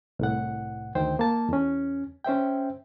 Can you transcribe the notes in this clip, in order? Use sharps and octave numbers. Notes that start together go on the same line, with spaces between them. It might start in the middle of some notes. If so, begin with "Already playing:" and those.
C2 A2 F#5
D2 D#3 C5 G5
A#3 A5
E2 C#4
C#4 C5 E5 G5